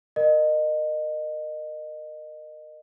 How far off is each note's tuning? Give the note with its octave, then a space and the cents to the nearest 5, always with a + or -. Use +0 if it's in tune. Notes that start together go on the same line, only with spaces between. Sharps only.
A#4 +0 D#5 -25